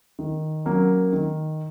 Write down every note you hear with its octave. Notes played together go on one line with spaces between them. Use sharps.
D#3
F#3 A#3 C#4
D#3